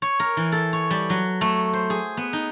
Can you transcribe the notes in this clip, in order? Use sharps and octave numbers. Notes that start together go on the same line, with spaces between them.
C#5
A#4
E3
A4
C#5
G3
F#3
A3
C5
G#4
B3
D#4